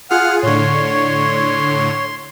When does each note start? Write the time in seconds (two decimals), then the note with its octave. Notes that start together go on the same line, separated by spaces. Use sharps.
0.10 F4 G#4 F#5 F6
0.43 A2 D3 C#5 C6